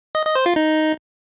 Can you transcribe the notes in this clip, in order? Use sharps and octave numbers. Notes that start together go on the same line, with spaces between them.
D#5
D#5
C5
F4
D#4